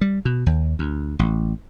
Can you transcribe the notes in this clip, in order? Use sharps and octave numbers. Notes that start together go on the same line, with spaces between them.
G3
B2
D#2
D2
A1